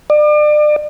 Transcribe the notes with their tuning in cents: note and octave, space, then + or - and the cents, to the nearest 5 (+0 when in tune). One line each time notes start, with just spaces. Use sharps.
D5 +35